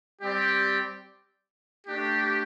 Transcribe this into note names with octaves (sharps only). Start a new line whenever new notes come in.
G3 C4 G4 D5 G5
A3 D4 G4